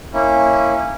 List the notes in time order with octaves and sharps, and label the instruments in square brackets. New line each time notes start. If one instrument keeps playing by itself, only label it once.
[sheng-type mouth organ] A#3 C#4 E4